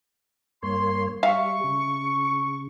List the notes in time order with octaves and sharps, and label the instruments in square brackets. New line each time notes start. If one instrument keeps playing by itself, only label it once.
[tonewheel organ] G2 A#3 C#5 [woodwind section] C6
[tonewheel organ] G3 [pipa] E5 F5 [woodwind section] C#6
[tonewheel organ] C#3